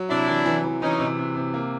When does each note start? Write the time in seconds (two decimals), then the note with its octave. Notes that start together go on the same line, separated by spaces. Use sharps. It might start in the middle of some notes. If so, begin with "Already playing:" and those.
Already playing: F#3
0.10 C3 D4 E4
0.28 E3
0.46 E3
0.64 E3
0.82 E3 C#4 D#4
1.00 C3
1.19 C3
1.36 C3
1.54 A#3